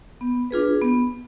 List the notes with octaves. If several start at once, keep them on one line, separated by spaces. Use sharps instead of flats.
B3
D4 F4 G#4 B4
B3